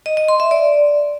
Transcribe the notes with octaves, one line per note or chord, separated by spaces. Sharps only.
D#5
D#5
C6
E5
D5